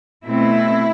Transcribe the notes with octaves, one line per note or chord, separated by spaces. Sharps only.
B2 A3 C4 E4